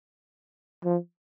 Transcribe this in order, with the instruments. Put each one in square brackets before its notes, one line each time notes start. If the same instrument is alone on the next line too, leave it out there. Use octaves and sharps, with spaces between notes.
[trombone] F3